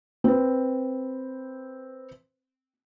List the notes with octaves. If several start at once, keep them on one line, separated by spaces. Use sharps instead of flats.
C4 B4